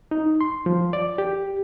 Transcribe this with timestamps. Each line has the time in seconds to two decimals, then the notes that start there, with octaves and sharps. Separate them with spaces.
0.11 D#4
0.41 C6
0.66 F3
0.93 D5
1.18 G4